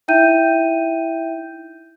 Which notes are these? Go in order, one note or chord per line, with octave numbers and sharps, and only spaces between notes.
D#4 E4 E5 G5 G6 D#7